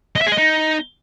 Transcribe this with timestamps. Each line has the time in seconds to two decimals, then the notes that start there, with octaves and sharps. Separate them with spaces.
0.16 D#5
0.21 E5
0.27 G#4
0.32 D#5
0.37 D#4